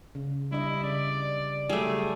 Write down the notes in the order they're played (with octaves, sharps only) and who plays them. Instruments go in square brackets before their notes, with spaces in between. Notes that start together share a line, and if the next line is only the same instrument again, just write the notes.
[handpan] C#3
[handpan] G3 D4 D#5 [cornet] E4
[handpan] C#3 [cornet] D5
[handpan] F#3 D5 [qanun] G3 A3 [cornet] G#4